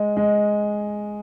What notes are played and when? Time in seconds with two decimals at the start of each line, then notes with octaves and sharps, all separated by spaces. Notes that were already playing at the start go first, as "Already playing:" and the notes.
Already playing: G#3
0.17 G#3